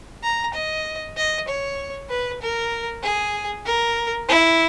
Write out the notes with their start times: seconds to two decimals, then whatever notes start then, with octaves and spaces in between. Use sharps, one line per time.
0.23 A#5
0.54 D#5
1.17 D#5
1.48 C#5
2.10 B4
2.42 A#4
3.03 G#4
3.66 A#4
4.29 E4